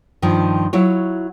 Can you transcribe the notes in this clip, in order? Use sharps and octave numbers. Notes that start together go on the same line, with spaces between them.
G2 D#3 F3
F#3 E4 F4 C#5